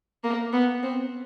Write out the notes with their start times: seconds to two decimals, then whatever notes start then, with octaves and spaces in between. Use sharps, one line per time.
0.24 A#3
0.53 B3
0.83 C4